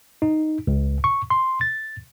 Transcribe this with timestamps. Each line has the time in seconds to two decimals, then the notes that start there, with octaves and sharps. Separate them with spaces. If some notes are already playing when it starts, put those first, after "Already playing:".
0.22 D#4
0.67 C#2
1.04 C#6
1.30 C6
1.61 A6